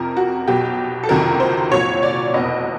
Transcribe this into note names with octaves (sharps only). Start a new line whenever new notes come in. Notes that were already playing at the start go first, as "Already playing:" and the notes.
Already playing: F2 C3 F3 A#4
F#4
B1 B2 F#3 G4
A4
F#1 F2 C3 D#3 F#3 A#4
C5
C2 A#2 F#3 C#5
D5
F1 E2 B2 D#5